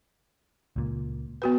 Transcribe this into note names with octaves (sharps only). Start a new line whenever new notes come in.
C#2 A#2
B3 F#4 B4